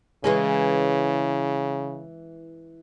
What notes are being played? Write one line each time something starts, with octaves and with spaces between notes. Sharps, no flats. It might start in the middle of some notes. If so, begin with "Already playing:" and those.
C#3 E3 G#3 C#4